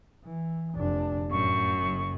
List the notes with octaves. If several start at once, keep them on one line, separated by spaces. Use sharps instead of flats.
E3
F1 D4
F#2 A2 C#6
F#1